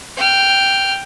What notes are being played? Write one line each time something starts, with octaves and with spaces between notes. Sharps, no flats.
G5 F6